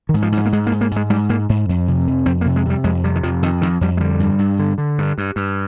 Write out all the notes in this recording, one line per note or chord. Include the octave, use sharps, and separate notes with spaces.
D#3
G#2
F3
G#2
F3
A#3
G#2 G#3
A#3
G#2
A#3
G#2 G#3
G#2 G3
G#2 A#3
G#2
F2
C3
F2
F2 C4
A#3
C3
G#3
C3 G3
F2 G#3
C3 G3
D#3
F2 F3
F2 D#3
F2 D#3
F2 G3
G#3
D3 G3
G2
G2
D3
D3
G2
G2
G2